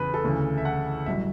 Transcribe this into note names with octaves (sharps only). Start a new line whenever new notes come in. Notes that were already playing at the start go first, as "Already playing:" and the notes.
Already playing: E2 C#3 B4
A4
D2 C#3 E3
E5
F#5
A1 G2 F#3 E5